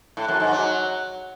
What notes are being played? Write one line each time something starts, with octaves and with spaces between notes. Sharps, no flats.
A2
F#2
G#2
F#3